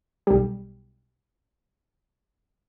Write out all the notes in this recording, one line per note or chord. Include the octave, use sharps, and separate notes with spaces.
B1 G3